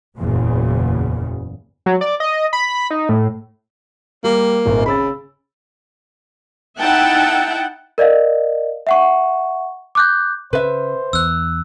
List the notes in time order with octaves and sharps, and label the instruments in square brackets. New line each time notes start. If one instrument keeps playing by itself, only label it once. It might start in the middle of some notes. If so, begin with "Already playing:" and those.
[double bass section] F#1 E2 A#2 C#3
[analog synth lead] F#3
D5
D#5
B5
D#4
A2
[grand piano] G3 [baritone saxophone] A#3
[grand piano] D#1 G#1
[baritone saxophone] C#3 [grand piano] B5 E6 A6
[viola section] D#4 E4 E5 F#5 G5 A5
[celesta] A#4 D5 D#5 F5
E5 F#5 C#6
D6 F#6 G6
[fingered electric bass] C#3 [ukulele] B4 E5 [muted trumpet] C5
[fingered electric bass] E2 [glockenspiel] E6 F#6